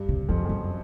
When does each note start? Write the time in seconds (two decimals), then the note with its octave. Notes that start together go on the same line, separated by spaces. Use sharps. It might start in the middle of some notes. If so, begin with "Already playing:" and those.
Already playing: G2
0.09 C3
0.29 F2 F3
0.38 F#2
0.45 F2 F#3